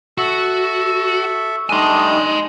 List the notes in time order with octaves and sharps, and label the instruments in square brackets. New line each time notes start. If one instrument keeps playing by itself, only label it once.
[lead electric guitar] F#4 [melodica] A4 E5 C#6
[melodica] G3 A3 D4 [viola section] D#4 D#5 [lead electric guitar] G#5 C6